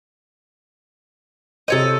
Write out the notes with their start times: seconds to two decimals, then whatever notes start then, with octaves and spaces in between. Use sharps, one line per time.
1.68 C3 A4 C5 C#5 D#5